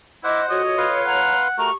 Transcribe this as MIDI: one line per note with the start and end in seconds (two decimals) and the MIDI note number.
0.24 0.41 64
0.24 0.62 72
0.24 0.46 75
0.24 0.62 78
0.24 0.40 86
0.50 1.34 65
0.50 0.85 66
0.50 1.34 69
0.50 1.34 73
0.50 0.94 75
0.78 1.48 71
0.78 1.48 77
0.78 1.48 84
1.06 1.58 78
1.06 1.40 82
1.58 1.71 57
1.58 1.71 66
1.58 1.75 67
1.58 1.71 70
1.58 1.70 82
1.58 1.75 85